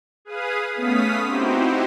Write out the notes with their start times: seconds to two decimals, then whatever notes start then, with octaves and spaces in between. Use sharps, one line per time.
0.25 G#4 B4 F5 D#6
0.76 A3 B3 C#4 F5 D#6 B6
1.26 C4 D#4 E4 F#4 G4 C5